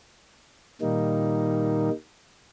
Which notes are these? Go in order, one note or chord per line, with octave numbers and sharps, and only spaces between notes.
A#2 D#3 G3 A#3 D#4